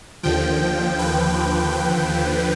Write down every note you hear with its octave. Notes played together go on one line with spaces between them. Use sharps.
D#2 D3 F3 G5
B4
B4